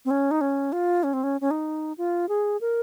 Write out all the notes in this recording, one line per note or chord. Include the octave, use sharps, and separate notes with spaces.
C4
C#4
D#4
C#4
F4
C#4
C4
C#4
C#4
D#4
F4
G#4
A#4